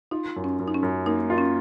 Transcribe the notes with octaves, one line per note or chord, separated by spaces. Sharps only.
D#4 F4
F#2
C#4
F#2
D#4
C#4
F#2
A#3 D#4
F4
C#4